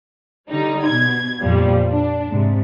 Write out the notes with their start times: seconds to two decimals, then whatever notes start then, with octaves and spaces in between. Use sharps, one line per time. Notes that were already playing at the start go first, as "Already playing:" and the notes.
0.48 D3 G3 D#4
0.86 B2 G#6
1.41 F2 A#2 F3 G3
1.91 D4
2.27 G#2 C3